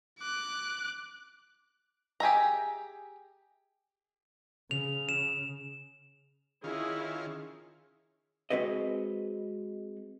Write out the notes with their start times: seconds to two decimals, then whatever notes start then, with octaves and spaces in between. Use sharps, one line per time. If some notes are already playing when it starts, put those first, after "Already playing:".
0.19 D6 F#6
2.20 G4 G#4 E5 A#5
4.71 C#3 F7
5.09 E7
6.64 D#3 C#4 E4 F4 G#4
8.50 G#3 C4 F#4 B4 D#5